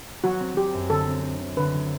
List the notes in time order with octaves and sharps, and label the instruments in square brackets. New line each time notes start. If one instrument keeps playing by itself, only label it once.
[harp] F#3 [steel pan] F#4
[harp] C4
[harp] F#3 [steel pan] G4
[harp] F#2
[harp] D3 [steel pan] A4
[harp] C4
C4
C4
[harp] D3 [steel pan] B4
[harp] F#3